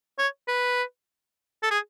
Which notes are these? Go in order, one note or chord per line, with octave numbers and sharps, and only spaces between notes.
C#5
B4
A4
G#4